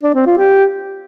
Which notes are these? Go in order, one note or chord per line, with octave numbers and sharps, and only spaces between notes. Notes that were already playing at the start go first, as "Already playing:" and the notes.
D4
C4
F4
G4